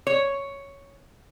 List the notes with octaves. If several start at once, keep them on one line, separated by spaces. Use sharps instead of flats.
C#5